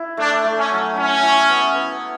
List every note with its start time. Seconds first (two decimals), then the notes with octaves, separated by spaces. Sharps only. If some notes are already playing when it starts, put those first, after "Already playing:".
Already playing: E4
0.17 A3 D4
0.44 A3
0.58 C#4
0.71 F#3
0.96 C#4 E4
1.22 E4
1.49 B3
1.75 B3